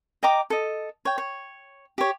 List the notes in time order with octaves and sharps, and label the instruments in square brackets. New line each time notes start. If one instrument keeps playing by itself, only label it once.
[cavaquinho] D#5 G5 A#5 D6
A4 D#5
C#5 G5
C#5
G4 C#5